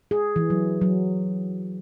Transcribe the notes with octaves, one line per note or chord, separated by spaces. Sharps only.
G#4
E3
F#3
F#3